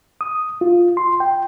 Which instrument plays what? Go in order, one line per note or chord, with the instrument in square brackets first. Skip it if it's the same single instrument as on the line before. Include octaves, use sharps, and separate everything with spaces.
[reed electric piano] D#6
F4
C6
G5